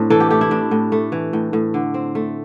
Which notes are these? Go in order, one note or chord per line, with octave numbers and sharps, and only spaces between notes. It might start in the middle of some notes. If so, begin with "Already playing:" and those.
Already playing: A2 C4 D4
E3 A4
G4
A3 G4
E4
A2 D4
A2
A3
E3
A2
A2
D3
C4
A3